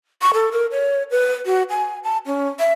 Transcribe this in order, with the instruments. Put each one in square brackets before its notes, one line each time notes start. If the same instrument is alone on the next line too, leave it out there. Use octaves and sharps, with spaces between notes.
[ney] C#6
A4
A#4
C#5
B4
F#4
G#5
A5
C#4
E5